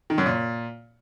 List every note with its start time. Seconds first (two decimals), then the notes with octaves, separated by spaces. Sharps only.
0.10 D#3
0.18 F#2
0.26 A#2